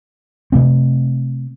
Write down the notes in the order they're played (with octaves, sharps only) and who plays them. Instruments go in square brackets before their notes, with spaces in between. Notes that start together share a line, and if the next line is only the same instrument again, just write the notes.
[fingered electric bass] C3 A3 C4